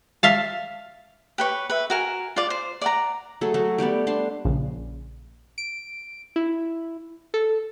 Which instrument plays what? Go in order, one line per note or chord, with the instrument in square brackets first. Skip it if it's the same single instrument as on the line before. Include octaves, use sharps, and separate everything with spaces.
[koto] E5 F5 A5
[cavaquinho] G4 B4 C#5
B4 E5
F#4 A#4 G#5
F4 D5
C5
D5 F#5 A#5
[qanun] F#3 A3 G#4 A4
F#3 A3 F#4
G3 A3 B3 D5
B3 D4 A5 C6
[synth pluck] A#1 C#3
[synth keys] D7
E4
A4